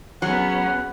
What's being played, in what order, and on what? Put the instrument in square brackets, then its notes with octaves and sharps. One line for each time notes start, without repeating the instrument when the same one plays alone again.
[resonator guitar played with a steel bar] F#3 [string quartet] B3 C#4 G#4 [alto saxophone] F#5